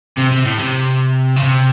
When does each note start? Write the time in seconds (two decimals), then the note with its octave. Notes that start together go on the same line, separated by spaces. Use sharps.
0.17 C3
0.31 C3
0.45 A2
0.59 C3
1.36 C#3
1.43 C3